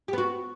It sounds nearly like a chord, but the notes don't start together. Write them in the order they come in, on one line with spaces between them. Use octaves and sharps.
G4 B3 F#4